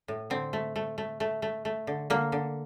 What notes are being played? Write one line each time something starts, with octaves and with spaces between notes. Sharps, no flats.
A2
D3 C4
A3
A3
A3
A3
A3
A3
D3
D3 A#3
D3